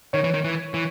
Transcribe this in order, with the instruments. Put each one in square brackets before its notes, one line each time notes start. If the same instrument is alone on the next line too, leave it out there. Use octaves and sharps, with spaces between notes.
[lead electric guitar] D#3 [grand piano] C#5
[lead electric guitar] E3
D#3
E3
E3